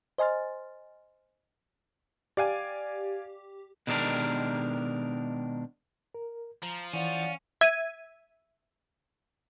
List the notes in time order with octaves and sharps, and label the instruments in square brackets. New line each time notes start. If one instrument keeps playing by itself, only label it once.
[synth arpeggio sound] C5 D#5 G#5 C6 F6 A6
[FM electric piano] G4 [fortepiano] D5 F5 G#5
[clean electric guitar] B2 D#3 G#3 D4 G4 A#4
[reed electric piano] A#4
[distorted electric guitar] F3 [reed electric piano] A#5
[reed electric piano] E3 [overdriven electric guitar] C#4 [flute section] D5 F5 F#5
[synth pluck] E5 G#6 D#7